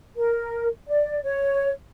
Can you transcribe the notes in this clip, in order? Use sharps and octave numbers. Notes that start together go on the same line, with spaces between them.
A#4
D5
C#5